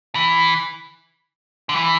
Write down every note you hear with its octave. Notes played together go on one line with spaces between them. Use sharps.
E3
D3
E3